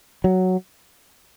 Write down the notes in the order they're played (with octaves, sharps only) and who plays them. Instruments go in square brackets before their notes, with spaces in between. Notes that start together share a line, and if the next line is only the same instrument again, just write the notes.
[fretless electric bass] F#3